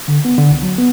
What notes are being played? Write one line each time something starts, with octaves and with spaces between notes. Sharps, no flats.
D3
B3
D3
C2
F#3
B3